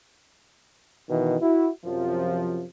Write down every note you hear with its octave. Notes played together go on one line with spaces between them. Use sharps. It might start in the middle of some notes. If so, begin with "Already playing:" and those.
B2 D#3 E3
E4 F#4
F#2 C3 F3